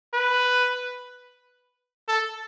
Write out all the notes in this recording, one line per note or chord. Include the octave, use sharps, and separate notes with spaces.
B4
A4